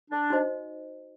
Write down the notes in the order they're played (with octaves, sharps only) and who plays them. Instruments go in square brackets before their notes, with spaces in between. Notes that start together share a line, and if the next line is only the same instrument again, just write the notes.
[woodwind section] D4
[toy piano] D#4 F#4 C5 D#5